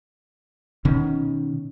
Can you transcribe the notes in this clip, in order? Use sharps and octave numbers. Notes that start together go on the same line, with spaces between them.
B2 D#3 C#4